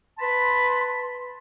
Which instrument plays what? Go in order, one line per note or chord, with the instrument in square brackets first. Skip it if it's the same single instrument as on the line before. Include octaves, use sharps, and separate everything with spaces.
[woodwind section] B4 A5 B5 C6